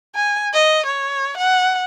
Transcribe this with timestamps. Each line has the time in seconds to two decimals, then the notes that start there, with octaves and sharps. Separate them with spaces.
0.15 G#5
0.54 D#5
0.86 C#5
1.38 F#5